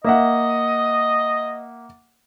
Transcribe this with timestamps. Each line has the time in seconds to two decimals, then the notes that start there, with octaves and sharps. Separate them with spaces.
0.04 A#3 D#5 E5 F#5